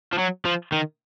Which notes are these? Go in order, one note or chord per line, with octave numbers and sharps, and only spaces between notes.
F3
F#3
F3
D#3